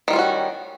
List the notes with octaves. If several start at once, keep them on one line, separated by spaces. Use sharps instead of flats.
D#3 G3 C#4 F4 F#4